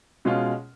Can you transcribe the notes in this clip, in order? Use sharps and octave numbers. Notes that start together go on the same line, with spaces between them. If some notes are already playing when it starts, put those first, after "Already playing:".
B2 G#3 C#4 F4